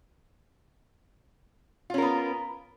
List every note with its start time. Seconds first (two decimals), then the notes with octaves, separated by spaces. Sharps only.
1.90 F4
1.94 C#4
1.98 A#4
2.02 B3